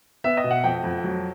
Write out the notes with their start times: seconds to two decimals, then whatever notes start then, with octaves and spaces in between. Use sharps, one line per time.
0.24 B3 E5
0.37 D#5
0.44 B2
0.51 F#5
0.64 F2 G5
0.84 F2
1.04 F#3